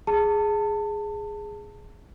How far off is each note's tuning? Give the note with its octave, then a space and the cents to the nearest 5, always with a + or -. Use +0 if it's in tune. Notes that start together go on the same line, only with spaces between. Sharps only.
G#4 +0 A5 +20